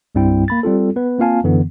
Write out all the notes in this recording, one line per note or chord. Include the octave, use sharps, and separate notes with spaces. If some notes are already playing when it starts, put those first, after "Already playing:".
C2 G2 G3 C4 E4 G5
A#3 B5 A6
G3 C4 F4 A4
B3 B4
A#3 C4 F4 F5 G#5 A5
F#2 D3 E3 B3